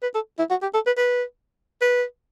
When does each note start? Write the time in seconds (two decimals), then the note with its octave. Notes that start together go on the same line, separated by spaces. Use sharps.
0.03 B4
0.15 A4
0.39 E4
0.50 F#4
0.62 G4
0.74 A4
0.86 B4
0.98 B4
1.81 B4